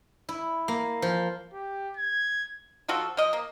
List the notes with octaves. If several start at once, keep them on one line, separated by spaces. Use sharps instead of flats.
E4
A#3
F3
G4
G#6
F3 F4 F#4 A4
F3 D#5
A#3